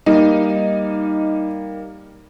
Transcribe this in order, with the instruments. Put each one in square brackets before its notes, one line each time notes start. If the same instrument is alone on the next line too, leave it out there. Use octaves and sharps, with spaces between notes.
[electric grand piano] G3 A#3 [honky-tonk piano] D#4